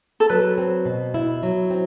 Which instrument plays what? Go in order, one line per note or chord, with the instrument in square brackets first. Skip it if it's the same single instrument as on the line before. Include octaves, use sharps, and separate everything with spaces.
[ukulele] A4
[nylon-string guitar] F#3 [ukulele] B4
[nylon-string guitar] C4
B2
E4
F#3
C4